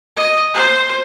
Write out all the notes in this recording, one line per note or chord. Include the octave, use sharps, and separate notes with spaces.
D#5
C5